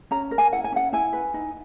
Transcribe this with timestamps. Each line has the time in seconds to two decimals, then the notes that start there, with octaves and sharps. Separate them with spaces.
0.11 C#4 A#5
0.31 A#4
0.38 G#5
0.52 E4 F#5
0.64 G#5
0.72 C#4 F#5
0.93 E4 G#5
1.13 B4
1.34 D#4